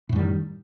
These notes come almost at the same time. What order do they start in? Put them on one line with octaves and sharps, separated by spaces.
A2 F#2 G3 D#3